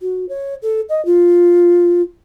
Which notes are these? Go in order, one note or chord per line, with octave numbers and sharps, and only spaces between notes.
F#4
C#5
A4
D#5
F4